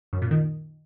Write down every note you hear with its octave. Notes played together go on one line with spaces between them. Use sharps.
F#2
A#2
D#3